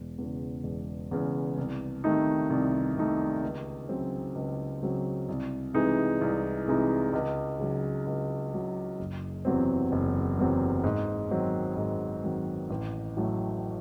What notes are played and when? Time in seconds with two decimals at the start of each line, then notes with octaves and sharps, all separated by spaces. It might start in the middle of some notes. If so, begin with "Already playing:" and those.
Already playing: E1
0.18 E2 C#3
0.64 E1
1.11 E2 C#3
1.58 C2
2.04 C3 D#3 A3 D#4
2.50 C2
2.96 C3 D#3 A3 D#4
3.43 C#2
3.89 C#3 F#3 C4
4.35 C#2
4.82 C#3 F#3 C4
5.29 C2
5.74 C3 E3 G#3 D#4
6.21 C2
6.68 C3 E3 G#3 D#4
7.13 C#2
7.59 C#3 F#3
8.06 C#2
8.53 C#3 F#3
8.99 F#1
9.45 E2 C3 F#3 C4
9.92 F#1
10.39 E2 C3 F#3 C4
10.84 G#2
11.31 D#3 F#3 C4
11.77 G#2
12.24 D#3 F#3 C4
12.70 A1
13.17 A2 F#3 A3